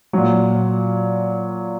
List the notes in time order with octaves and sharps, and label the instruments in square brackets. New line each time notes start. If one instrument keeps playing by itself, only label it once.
[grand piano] A#2 F#3